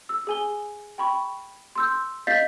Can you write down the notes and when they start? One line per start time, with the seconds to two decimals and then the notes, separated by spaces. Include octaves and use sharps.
0.09 E6
0.27 G#4 G#5 G7
0.98 G5 B5 C#6
1.75 C6 E6 G6
2.27 D#5 F5 G6 A6 B6 C7